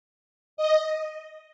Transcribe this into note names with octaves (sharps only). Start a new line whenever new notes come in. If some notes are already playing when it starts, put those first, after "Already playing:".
D#5